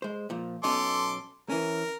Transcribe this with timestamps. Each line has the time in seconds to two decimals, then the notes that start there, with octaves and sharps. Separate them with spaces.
0.02 G#3 C5
0.30 A#2 F3
0.64 B1 B2 C#4 A4 C6 D6
1.49 E3 C#4 A#4